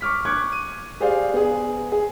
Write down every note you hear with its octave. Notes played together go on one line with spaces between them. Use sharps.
C#6 D6 F6 B6
C#6 D6 F#6 G#6
D#7
G4 G#4 C5 D5 F5
B3 G#4
G#4